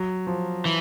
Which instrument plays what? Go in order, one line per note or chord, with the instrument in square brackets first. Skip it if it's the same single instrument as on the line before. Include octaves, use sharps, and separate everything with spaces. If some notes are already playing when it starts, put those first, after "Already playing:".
Already playing: [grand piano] F#3
F3
[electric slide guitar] E3